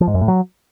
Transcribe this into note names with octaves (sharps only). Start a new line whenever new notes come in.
F3
G#2
F#2
A2
F#3